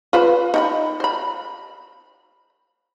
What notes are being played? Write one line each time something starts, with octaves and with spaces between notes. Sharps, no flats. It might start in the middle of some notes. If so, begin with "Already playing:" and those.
F4 B4 C5
D#4 G5 B5
C5 B5